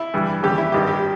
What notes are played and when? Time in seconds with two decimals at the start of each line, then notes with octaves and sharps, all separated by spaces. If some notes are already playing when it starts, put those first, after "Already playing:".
Already playing: E4
0.14 G2 E3 G3
0.43 D#2 C#3 E3 G3 G4
0.58 E4
0.72 G#1 G2 D#3 G3 G4
0.87 G4